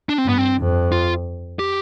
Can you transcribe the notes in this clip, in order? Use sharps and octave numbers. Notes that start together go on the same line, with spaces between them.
D4
C4
G2 B3
C4
F2
F4
G4